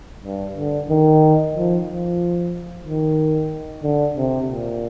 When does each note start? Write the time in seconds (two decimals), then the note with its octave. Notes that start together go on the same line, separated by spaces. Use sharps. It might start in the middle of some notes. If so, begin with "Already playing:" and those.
0.24 G2
0.57 D3
0.89 D#3
1.55 F3
1.87 F3
2.85 D#3
3.83 D3
4.16 C3
4.49 A#2